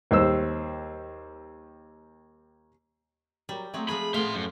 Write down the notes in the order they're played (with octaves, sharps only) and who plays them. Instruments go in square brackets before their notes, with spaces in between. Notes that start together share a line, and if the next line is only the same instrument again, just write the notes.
[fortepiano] D#2 G3 C5 E6
[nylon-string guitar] F#3 A#4 [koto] G3
[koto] F#3 C4 D#4 [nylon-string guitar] A3 E5
[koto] F3 G#3 G#4 [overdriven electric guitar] B5
[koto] A2 F5 [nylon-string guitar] A3 B3 [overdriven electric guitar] E5 C6
[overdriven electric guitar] F#2